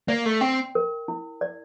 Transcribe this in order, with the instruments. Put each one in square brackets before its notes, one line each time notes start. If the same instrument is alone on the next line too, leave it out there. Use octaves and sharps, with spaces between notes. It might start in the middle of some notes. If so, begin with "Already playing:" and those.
[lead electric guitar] A#3 [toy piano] D5
[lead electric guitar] A3
[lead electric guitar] C4 [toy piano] G5
[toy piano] A#4
E4
D5